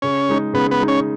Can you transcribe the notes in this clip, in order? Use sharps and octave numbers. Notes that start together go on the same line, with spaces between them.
C#3 C#4
G#3 D#4
C#3 B3
B3
G#3 D#4
C#4